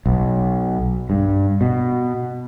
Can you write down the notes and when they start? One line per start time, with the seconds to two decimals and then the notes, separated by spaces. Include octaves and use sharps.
0.06 B1
1.10 G2
1.61 B2